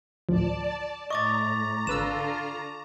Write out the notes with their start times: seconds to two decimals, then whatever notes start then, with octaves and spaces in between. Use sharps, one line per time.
0.29 A1 D2 F3 D5 A5
1.10 A2 D#5 A#5 C#6 D6 A6
1.87 G#1 D3 F4 B4 E6 E7